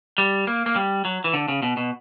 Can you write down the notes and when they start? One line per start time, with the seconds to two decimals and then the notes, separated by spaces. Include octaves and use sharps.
0.18 G3
0.47 A#3
0.66 A#3
0.76 G3
1.05 F#3
1.24 E3
1.34 D3
1.48 C#3
1.62 B2
1.77 B2